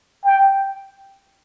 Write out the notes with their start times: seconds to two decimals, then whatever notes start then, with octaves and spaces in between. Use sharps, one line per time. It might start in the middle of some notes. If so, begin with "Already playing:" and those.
0.25 G5